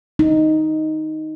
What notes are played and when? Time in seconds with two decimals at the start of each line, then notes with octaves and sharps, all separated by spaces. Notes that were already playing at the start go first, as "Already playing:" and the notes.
0.19 D#4